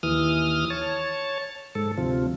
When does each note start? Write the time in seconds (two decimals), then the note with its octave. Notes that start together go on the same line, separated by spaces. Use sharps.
0.03 D#2 E3 D#6 F6
0.70 C#5 A5
1.75 G#2 A4
1.98 D2 C3 F3